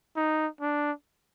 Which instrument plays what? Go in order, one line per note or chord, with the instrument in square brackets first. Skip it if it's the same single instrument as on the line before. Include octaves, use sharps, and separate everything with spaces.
[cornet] D#4
D4